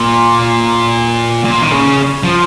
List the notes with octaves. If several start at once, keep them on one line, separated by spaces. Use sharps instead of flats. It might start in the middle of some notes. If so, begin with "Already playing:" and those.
Already playing: A#2
A#2
D#3
C#3
F3